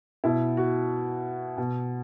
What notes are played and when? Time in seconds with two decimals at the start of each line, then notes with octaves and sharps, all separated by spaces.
0.24 B2 E4
0.57 F#4
1.57 B2